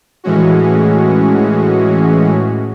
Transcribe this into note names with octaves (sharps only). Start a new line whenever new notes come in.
A2 E3 G#3 C#4 F#4